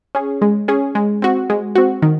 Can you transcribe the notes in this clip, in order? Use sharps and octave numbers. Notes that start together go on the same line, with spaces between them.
C#4 G#4
G#3
C#4 G#4
G#3
C4 F#4
G#3
C4 F#4
D#3